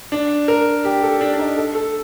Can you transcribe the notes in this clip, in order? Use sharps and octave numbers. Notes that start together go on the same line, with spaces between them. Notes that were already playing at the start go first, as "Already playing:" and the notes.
D4
A#4
G4
A4
D4
D4
D#4
A4
A4